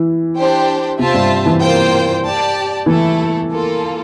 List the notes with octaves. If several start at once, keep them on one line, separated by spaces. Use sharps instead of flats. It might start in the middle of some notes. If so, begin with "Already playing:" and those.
Already playing: E3 E4
D4 G4 C5 G5
C3 C4 F4 C5 E5 A5
G2 G3
E3
A#3 F4 C5 G5
G4 D5 A5
E3 A3 E4 A4
A#3 F4 A4